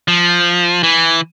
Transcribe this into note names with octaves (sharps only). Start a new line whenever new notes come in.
F3
E3